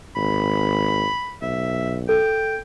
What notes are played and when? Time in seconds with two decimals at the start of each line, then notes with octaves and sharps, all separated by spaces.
0.16 G#1 B5
1.42 B1 E5
2.09 A4 G5